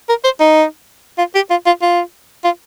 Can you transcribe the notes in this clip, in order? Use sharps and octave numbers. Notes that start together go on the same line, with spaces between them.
A#4
C5
D#4
F4
G4
F4
F4
F4
F4